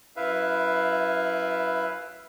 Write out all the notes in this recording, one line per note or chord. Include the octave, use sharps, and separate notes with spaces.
F#2 E4 B4 E5 F5